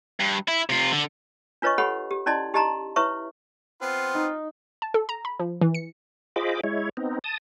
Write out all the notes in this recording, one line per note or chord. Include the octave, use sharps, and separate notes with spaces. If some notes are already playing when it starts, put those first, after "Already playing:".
G2
E4
C3 F4
D3
D4 F4 B4 C#5 D#5 C#6
G4 A4 C#5 F#5 B5
G4
C#4 E4 D5 D#5 A5 C6
D#4 G4 D#5 A5 A#5 C6
E4 B4 C#5 E5 C#6
B3 C4 F4 C6
D#4
A5
A4
A#5
B5
F3
E3
C#7
F4 G#4 C5 D#5 B5 D6
G#3 E4 C#5
B3 C4 D#4
A5 D#6